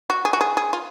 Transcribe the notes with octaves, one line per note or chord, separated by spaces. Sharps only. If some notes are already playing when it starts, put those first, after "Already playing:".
F#4
G#4
F#4
G#4
G#4
F4